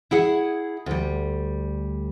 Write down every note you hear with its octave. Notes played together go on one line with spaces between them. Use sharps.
E4 G#4 F#5
D2 G3